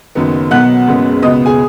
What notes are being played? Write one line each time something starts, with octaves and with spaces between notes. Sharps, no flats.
F#1 F#2 D#3 B3
B1 B2 F#3 B3 F#5 F#6
F#1 F#2 C#3 G#3 B3
C#2 B2 B3 D#5 D#6
G#4 G#5